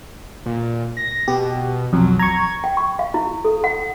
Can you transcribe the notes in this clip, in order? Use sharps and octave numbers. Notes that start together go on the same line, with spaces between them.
A#2
A#6
B2 G4
B1 F2 F#3
A#5 C#6 G#6
G5
C#6
F5
E4
A4
F#5